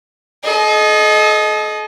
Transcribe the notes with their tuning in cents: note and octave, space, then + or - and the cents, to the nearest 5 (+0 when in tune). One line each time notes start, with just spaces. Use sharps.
A4 -45 D#5 +0